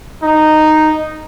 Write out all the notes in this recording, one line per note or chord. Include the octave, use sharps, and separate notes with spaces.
D#4